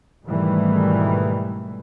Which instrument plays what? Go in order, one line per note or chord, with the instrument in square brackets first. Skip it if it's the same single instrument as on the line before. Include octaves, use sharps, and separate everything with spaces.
[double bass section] G#2 B2 D#3 E3 G3 A3